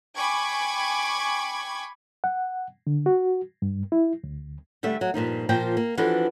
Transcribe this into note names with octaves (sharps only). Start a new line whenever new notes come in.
G5 G#5 B5 C#6 D6 G#6
F#5
D3
F#4
G2
E4
D2
D3 G3 A3 E5
F#3
G2 A#2 F3 D#4
A#2 F3 A#3 C5 G5 A5
A#3
E3 F3 D4 F#4 A4 B4